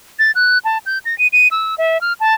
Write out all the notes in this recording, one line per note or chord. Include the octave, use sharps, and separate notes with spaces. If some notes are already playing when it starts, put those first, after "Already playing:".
A6
F#6
A5
G6
A#6
D#7
D#7
E6
E5
F6
A5